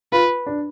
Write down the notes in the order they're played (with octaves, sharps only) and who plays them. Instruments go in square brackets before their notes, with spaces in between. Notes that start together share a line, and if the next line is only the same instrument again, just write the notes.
[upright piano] F4 [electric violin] B4
[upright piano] D4